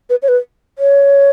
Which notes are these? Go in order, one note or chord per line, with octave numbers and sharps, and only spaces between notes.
B4
C#5
B4
C#5